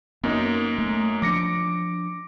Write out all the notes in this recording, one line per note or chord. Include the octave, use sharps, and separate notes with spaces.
F#2 A#3 B3 D#4
A3
F3 D4 D6 A#6 C#7